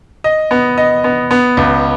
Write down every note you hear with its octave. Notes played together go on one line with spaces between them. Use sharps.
D#5
B3
D#5
B3
B3
C#2